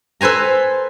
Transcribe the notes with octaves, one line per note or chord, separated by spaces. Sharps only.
A4 B4 C5 G#5 A#5